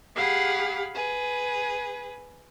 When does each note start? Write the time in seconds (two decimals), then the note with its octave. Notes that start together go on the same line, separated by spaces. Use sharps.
0.15 G4 G#4 F5 F#5 B5
0.94 G#4 B4